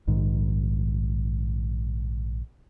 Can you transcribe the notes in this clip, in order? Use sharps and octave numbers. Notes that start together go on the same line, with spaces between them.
A#1 G#2 D#3